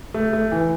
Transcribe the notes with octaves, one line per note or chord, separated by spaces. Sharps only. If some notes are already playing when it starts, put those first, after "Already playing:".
A3
A3
E3